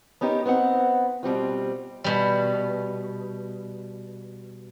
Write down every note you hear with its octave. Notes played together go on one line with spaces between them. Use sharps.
B3 C#4 D#4 G4 A#4
B3 C4 D#4 F#5
B2 G3 C4 F4
B2 G3